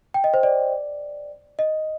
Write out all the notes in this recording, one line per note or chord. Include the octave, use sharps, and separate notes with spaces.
G5
D#5
C5
D5
D#5